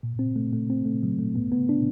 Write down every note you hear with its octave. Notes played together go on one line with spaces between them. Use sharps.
A#2
C4
A3
A3
C4
A3
F#3
A3
B3
B3
D4